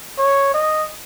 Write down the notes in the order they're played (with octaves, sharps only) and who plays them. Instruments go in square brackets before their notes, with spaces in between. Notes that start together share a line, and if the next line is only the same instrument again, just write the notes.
[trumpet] C#5
D#5